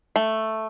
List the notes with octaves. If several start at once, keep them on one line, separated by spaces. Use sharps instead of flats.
A3